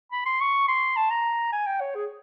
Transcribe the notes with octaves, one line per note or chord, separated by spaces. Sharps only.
B5
C6
C#6
C6
A5
A#5
G#5
G5
C#5
G#4